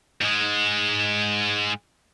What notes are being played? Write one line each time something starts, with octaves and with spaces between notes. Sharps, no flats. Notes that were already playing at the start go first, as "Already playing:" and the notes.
G#2 G#3